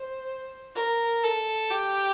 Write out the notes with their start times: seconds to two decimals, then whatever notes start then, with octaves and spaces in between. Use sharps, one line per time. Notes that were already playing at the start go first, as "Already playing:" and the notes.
Already playing: C5
0.76 A#4
1.24 A4
1.71 G4